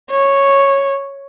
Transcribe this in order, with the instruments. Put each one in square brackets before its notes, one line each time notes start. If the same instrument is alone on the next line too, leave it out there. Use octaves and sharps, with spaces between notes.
[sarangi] C#5